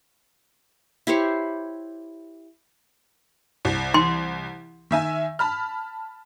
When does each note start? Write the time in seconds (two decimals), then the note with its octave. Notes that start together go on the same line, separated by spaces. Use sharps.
1.07 E4 G4 C5 C#5
3.65 C2
3.94 C6
4.91 D#3 E5 G#5
5.39 A5 B5 F6